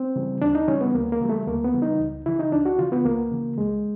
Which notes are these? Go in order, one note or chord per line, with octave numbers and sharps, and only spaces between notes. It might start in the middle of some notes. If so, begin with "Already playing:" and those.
Already playing: C4
C#3 E3 G3
D2 D4
D#4
C#3 E3 G3 C#4
B3
D2 A#3
A#3
C#3 E3 G3
A3
D2 A#3
B3
C#3 E3 G3
D#4
C#2
C#3 E3 E4
D#4
C#2 D4
F#4
C#3 E3 F4
B3
C#2 A#3
C#3 E3
C#2 G#3